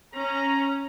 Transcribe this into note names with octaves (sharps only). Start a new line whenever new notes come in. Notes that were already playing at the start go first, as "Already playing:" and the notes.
C#4 A#5